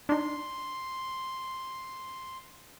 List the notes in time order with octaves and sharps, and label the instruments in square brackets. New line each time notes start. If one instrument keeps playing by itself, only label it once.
[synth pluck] D4 D#4 [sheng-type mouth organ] C6